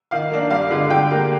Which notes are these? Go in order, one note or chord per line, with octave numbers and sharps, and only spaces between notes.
D#3 F5
A#3 D4
G2 F5
D3 G#3
D3 G5
G3 A#3